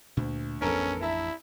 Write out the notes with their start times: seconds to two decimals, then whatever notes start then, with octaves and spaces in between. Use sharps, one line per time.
0.17 D2 A#2
0.62 A1 F2 B3 C#4 D4 A4 A#4
1.01 E4 E5 A5 A#5